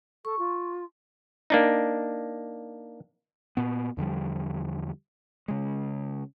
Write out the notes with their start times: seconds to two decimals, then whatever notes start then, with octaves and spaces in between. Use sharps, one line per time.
0.25 A4 C#6
0.38 F4
1.50 A#3 D4 D#4
3.57 A#2 B3
3.97 E2 D3 F3 G3
5.48 C#3 G#3